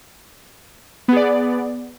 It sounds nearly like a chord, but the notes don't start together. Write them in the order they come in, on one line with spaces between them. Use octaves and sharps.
B3 G#4 D5